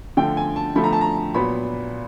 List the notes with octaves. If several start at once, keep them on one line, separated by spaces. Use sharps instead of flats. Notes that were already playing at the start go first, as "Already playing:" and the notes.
D3 F3 A3 G5
G#5
A5
D3 F3 A3 B5
A#5
A5
A#5
A#2 F#3 B3 B5